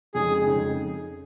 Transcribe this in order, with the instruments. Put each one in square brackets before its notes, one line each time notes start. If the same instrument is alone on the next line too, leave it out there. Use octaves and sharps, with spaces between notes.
[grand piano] F2 C#3 G#3 D#4 [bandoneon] G#4
[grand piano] F2 C#3 G#3 D#4